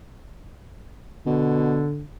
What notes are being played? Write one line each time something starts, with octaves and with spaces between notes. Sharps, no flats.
B2 D3